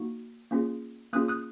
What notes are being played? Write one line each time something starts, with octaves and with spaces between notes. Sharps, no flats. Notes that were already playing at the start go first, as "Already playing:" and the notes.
Already playing: A#3 D#4 F#4
A#3 C#4 F4 G#4
A#3 C#4 F4 G#4 D#6 F#6
D#6 F#6